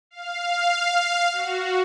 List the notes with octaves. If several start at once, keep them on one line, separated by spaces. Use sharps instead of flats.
F5
F#4